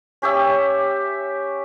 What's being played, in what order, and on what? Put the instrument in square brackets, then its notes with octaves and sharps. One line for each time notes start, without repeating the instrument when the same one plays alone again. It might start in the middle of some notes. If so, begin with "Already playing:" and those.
[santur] C#4 G4 C#5 E5